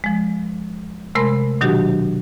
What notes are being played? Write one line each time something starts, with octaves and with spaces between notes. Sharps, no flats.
F3 G#3
C3 G#3 A3 A#4 B5 C6
B2 D#3 F#3 D4 F#4 G4